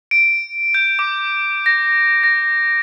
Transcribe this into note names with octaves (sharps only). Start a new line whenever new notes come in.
D7
G6
D6
A#6
A#6